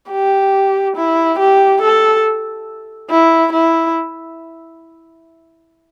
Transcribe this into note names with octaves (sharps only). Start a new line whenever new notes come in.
G4
E4
G4
A4
E4
E4